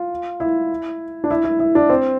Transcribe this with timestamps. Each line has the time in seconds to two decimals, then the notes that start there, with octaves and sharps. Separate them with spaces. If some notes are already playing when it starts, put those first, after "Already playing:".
Already playing: F4
0.40 E4
1.24 D4
1.31 E4
1.44 E4
1.59 E4
1.75 D4
1.90 C4